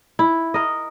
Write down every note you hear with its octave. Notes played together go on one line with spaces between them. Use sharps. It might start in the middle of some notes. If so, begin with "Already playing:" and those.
E4
A#4 D#5